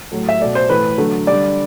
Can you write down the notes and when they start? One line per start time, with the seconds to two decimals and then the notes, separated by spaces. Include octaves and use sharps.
0.12 A2 F#3 A3
0.29 E5
0.40 B2 A3 D5
0.55 C5
0.69 A2 E3 A3 B4
0.98 D3 F#3 A3
1.27 D3 G3 D5